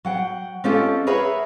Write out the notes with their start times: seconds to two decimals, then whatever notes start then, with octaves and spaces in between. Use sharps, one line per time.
0.05 F#3 F#5 G5
0.64 G#3 C4 C#4 F4 G4 A4
1.07 G#4 A#4 B4 C#5 E5 F#5